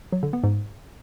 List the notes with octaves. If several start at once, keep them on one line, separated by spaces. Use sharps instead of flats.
F#3
D3
B3
G#2